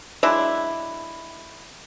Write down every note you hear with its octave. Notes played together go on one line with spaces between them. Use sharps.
F#3 G#3 D4 E4